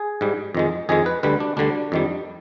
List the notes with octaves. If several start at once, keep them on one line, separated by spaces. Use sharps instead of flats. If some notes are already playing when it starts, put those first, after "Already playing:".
Already playing: G#4
G#2 G3
F2 D#3 G#3
F2 D#3 G#3 G#4
B4
D2 D3 G3 B4
D4
D2 D3 G3 D4
F2 D#3 G3